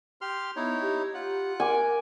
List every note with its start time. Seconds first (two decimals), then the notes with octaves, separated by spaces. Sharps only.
0.21 G4 C6 F6
0.56 B3 D#4 E4 C#5
0.81 G4
1.14 F4 F#5
1.60 A#4 G#5 D6